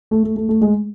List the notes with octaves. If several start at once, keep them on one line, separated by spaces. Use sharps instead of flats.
A3
A3
A3
A3
G#3